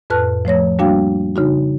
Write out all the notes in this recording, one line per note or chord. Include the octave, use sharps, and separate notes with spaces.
F2 A2 B4 A5 F6 F#6
F3 A3 C#5 A#6
G3 A#3 D4 F#4 F5 G5
C#3 D#4 F#4